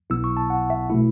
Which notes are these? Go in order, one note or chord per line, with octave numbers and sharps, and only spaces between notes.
B1 B2 F#3 B3 E4 E6
C#6
A5
F#5
E5
B2 A3 E4